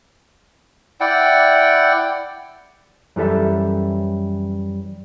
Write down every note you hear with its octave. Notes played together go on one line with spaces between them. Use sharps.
E4 D5 F#5 G5
F#2 E3 G3 A4 E5